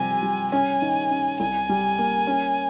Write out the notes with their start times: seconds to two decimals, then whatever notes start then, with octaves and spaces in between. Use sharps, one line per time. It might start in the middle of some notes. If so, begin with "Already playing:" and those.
Already playing: C3 F3 G3 G#5
0.23 G3
0.52 C#4 G#5
0.82 D#3
1.11 C#4
1.40 C2 G#5
1.69 G3
1.99 A#3
2.27 C#4